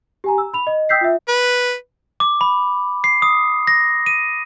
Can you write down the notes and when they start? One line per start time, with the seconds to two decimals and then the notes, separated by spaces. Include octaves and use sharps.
0.24 G4 G#5 A#5
0.38 E6
0.54 B5 F7
0.67 D#5
0.89 G5 D#6 E6 G6 B6 C7
1.01 F4 E5
1.28 B4
2.20 D6
2.41 B5
3.04 C7
3.22 D#6
3.67 A#6
4.06 D#7